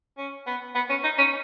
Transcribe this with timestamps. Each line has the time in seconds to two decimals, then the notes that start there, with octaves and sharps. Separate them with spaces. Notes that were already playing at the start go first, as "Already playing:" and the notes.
0.18 C#4
0.47 B3
0.75 B3
0.90 C#4
1.04 D#4
1.18 C#4